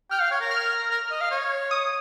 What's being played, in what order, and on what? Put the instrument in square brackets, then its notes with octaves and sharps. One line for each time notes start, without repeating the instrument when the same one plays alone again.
[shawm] G5 [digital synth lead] F6
[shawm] F5
C#5
A#4
[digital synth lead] F6
[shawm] A#4
D#5
F5
C#5
[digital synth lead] D#6